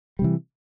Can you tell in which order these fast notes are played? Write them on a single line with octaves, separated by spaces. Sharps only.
G3 C3 E3